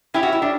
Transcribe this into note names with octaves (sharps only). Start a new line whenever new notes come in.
C#4 E4 G4 C#5 E5
F#4
E4
D4